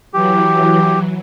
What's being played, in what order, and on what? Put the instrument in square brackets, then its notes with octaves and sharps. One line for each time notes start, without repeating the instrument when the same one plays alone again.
[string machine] E3 F#3 [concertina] G4